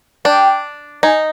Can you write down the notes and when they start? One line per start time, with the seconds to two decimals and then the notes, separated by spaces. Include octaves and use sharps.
0.25 D4 G5
1.03 D#4 G#5